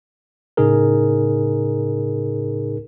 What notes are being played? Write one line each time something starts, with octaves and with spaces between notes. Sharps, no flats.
A2 C#3 D#4 G#4 A#4